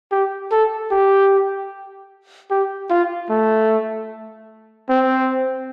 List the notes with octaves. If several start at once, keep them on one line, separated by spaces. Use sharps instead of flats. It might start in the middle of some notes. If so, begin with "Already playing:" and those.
G4
A4
G4
G4
F4
A3
C4